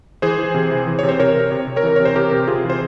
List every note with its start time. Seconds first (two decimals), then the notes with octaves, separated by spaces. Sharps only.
0.22 E3 G#4 C5
0.38 E3
0.54 C3
0.72 E3
0.87 E3
0.99 C3 C#5
1.09 C5
1.20 C3 A#4 C#5
1.36 C3
1.51 C3 C#5
1.67 C3
1.76 A#4 C#5
1.83 E3
1.96 C3 C#5
2.05 C5
2.15 C3 G4 A#4
2.32 C3
2.48 C3 F4 G#4
2.64 E3
2.70 C5